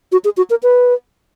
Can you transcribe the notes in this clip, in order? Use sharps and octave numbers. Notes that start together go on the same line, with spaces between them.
F#4
G#4
F#4
A#4
B4